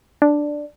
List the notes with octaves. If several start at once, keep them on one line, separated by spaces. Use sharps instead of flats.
D4